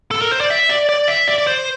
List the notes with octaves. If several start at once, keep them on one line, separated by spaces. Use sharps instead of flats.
A4
A#4
C5
D5
E5
D5
D5
E5
D5
D5
C5